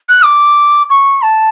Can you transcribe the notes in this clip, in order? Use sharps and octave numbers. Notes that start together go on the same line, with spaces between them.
F#6
D6
C#6
A5